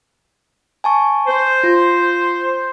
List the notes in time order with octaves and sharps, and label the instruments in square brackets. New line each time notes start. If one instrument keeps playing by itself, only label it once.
[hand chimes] G#5 A5 C#6
[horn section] C5
[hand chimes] F4